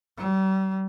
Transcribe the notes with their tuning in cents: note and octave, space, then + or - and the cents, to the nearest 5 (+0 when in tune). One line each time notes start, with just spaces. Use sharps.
G3 -40